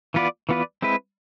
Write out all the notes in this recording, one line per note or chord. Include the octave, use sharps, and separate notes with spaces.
E3 B3 F4 B4 D5
E3 B3 F4 B4 D5
G#3 C4 E4 B4